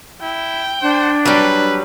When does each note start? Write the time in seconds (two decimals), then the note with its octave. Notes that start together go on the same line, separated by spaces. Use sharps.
0.22 E4 G5
0.82 D4 C5
1.25 F#3 G3 B4